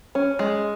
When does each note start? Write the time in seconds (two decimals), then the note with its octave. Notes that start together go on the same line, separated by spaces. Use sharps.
0.15 C#4
0.39 G#3